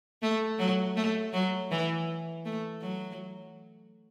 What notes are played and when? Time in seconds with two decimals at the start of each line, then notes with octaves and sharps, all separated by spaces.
0.22 A3
0.59 F#3
0.96 A3
1.33 F#3
1.71 E3
2.45 A3
2.81 F#3